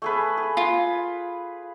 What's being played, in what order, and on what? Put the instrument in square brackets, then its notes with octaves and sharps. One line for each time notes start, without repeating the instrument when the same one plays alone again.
[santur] A3 G#4 B4
G#4
[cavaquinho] F4